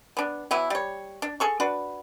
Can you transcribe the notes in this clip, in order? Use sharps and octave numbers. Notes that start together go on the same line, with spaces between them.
B3 D4
E3 F#3 B3 E4
G3 C#5
D4
G#4 A4 C#6
D4 F#4 B4